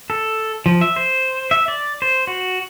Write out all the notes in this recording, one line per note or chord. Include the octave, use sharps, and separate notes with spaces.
A4
F3
E5
C5
E5
D5
C5
F#4